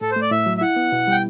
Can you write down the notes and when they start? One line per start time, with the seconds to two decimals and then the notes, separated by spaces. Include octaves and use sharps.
0.01 A2 A4
0.11 C5
0.16 A3
0.21 D5
0.31 A2 E5
0.46 F#3
0.57 E5
0.61 E4 F#5
0.76 B3
0.92 B2
1.07 G3 G5